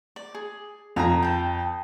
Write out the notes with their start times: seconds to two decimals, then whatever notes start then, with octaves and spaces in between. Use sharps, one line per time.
0.16 D5
0.35 G#4
0.96 F2 F5 G#5 A#5
1.22 G5 A5